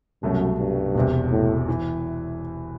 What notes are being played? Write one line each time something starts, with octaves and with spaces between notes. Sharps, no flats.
C2 F#2 B2 F#3 A3
G2
E1 E2 C3
A2
E3